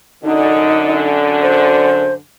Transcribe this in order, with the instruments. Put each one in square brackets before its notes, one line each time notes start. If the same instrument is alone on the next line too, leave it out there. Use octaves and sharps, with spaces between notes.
[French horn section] F#2 D3 [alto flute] D#4
[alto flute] C5